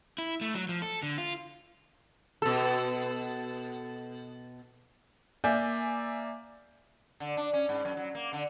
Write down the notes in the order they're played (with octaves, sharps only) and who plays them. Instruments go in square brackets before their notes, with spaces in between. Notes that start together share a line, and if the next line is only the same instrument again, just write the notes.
[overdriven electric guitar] E4
A3
F#3
F3
A4
D3
F4
[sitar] B2 A4
[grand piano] A#3 D5 E5 G#5 G6
[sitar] D3
D4
C#4
G#2
F#2
F#3
A#3
D3